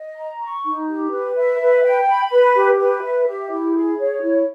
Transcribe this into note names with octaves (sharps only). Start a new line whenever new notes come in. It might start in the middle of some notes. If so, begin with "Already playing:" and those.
Already playing: D#5
A#5
C#6
D#4
G4
B4
E5
B4
G5
B5
B4
G4
B4
E5
G4
E4
G#4
C#5
E4